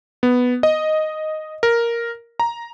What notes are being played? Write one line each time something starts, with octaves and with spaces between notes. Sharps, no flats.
B3
D#5
A#4
A#5